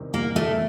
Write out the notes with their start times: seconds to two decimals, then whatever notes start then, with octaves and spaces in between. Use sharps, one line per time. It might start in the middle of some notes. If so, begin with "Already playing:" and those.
Already playing: E2 C3 D#3 G3
0.14 A#3
0.36 A3